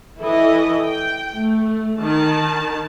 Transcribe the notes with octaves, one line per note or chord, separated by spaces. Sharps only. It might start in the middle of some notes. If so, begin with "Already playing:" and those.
E3 E4 A4 D#5
G5
A3
D#3 A5